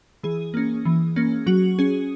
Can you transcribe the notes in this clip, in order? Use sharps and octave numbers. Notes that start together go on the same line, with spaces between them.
E3 G#4
A#3 C#4
E3
A#3 C#4
F#3 F#4
C#4 G#4